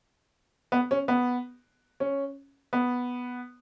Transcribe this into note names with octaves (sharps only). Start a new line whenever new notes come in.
B3
C#4
B3
C#4
B3